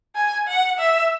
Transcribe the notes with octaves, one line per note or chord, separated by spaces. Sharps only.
G#5
F#5
E5